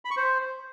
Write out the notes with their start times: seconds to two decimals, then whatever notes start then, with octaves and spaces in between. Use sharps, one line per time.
0.05 B5
0.11 C#6
0.17 C5